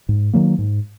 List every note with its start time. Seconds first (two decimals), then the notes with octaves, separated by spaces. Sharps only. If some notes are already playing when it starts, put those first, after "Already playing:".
0.09 G#2
0.33 D#3 F#3 A#3
0.58 G#2